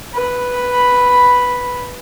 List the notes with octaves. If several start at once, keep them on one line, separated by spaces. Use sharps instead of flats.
B4 B5